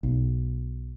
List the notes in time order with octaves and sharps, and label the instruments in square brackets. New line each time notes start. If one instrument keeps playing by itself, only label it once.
[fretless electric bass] B1